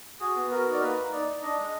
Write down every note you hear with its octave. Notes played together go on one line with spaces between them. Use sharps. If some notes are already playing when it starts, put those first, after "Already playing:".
F#4 G#4
B3
F#4 A#4
D#4
D5
A#3 B4
A#3
D#4 D5
D#4
D4 D#5
G#3